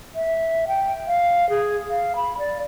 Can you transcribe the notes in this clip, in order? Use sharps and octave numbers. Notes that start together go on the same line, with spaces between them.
E5
G5
F5
G#4
F5
B5
D5